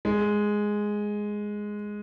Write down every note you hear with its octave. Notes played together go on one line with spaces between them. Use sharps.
G#3